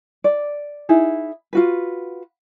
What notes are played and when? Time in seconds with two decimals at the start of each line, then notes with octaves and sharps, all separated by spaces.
0.24 D5
0.89 D#4 E4 G#4
1.53 F4 F#4 B4